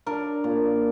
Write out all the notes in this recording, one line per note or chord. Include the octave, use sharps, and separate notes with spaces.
D4 A#4
A#2